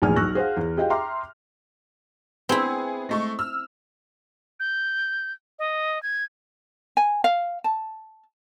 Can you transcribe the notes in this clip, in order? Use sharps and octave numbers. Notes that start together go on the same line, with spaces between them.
A#1 E2 A2 G#5 F6
B1 C#6 E6 F#6 A#6
G#4 C5 F5 F#5
E2
F4 G4 G#4 D#5 F5 G5
E5 G5 A#5 C6 D6 F6
B3 C4 E4 G#4
G#3 A3 C#6
E6 F6
G6
D#5
G#6
G#5
F5
A5